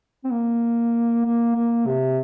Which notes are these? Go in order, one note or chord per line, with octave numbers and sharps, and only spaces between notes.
C4
A#3
A#3
A#3
C3